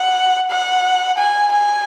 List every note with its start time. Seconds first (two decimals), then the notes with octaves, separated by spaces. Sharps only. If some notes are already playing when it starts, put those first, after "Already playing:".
Already playing: F#5
0.50 F#5
1.18 G#5
1.52 G#5